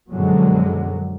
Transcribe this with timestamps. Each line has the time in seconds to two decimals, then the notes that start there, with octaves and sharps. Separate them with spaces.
0.11 F#2 B2 D3 F3 F#3 G#3